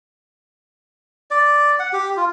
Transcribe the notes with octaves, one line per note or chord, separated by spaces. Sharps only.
D5
F#5
G4
F4